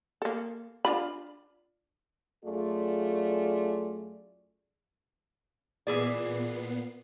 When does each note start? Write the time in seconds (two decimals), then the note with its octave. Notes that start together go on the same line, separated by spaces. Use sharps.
0.22 A#3 A4
0.85 D4 F4 B5
2.45 F#2 A3 F4 G#4 D5
5.87 A#2 E3 B3 G#4 D5 C7